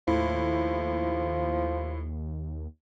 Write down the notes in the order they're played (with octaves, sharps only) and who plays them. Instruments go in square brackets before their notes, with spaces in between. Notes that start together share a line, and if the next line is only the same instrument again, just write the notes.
[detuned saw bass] D#2 [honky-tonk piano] A2 [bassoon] F3